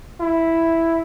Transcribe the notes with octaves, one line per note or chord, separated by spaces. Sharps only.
E4